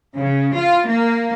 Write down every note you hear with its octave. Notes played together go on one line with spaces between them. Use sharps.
C#3
F4
A#3